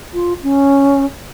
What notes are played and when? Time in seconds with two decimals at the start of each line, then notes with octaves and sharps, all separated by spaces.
0.14 F4
0.43 C#4